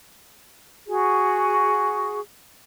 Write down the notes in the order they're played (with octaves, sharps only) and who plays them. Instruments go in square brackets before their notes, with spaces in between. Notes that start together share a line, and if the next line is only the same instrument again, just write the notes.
[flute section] F#4 G#4